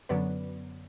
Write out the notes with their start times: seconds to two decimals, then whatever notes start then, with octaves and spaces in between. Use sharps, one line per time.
0.09 F#2 D3 F#3 B3 B4 D5